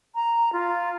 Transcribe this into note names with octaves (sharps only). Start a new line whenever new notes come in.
A#5
F4